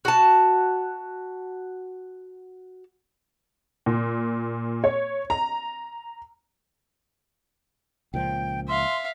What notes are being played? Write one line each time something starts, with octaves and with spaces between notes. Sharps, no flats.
F#4 A5
A#2
C#5
A#5
C#2 A#2 F3 G5
E5 F5 C6